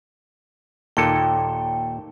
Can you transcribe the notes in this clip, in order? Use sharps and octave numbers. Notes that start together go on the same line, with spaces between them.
D#2 A#2 A4 G5